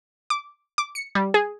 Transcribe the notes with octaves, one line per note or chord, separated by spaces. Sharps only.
D6
D6
C#7
G3
G#4